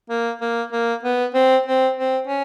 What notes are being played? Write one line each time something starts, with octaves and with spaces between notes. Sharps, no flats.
A#3
A#3
A#3
B3
C4
C4
C4
C#4